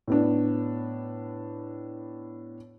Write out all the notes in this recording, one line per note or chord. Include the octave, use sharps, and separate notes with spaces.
A2 B3 D4